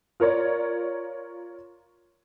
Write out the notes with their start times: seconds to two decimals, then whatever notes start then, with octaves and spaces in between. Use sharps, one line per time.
0.20 F4 A#4 C#5 D5